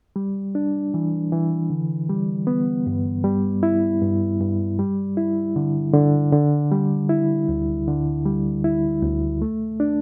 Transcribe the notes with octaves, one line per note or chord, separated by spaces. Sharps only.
G3
D4
E3
E3
D3
G3
B3
G2
G3
E4
G2
G2
G3
E4
D3
D3
D3
G3
E4
D2
D3
G3
E4
D2
A3
D4